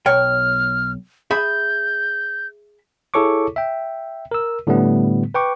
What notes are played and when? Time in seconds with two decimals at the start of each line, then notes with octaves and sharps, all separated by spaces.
0.06 B1 C#5 G5 F6
1.31 G#4 E5 B5 G6
3.14 E4 G#4 A4 C#5 C#6 D6
3.56 E5 G5
4.31 A#4 E6
4.67 A2 D3 G3 A3 B3
5.34 B4 G5 C#6 D6